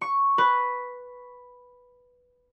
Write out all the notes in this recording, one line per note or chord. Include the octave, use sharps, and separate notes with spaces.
C#6
B4